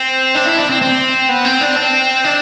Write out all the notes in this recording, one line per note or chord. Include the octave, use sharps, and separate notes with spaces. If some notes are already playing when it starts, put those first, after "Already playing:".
Already playing: C4
D4
E4
D4
C4
C4
B3
C4
D4
C4
D4